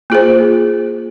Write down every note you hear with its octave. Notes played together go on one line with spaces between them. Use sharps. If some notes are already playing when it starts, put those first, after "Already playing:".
A#3 F4 G#4 C5